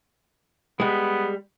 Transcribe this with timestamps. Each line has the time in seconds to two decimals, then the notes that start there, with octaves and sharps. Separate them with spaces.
0.80 G3 G#3 B3